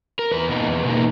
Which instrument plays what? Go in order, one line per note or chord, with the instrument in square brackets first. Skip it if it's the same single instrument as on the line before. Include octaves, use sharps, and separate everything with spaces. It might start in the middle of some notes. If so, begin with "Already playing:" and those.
[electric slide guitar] A#4
E2 B4
B2 A#3 D#4
E2
B2 A#3 D#4